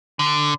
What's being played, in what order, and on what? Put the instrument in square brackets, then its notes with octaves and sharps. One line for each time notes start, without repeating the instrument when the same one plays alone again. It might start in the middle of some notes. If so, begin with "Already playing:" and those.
[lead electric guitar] D3